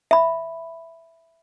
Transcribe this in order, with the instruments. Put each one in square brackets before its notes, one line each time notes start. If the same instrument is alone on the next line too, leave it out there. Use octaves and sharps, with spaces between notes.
[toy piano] E5 B5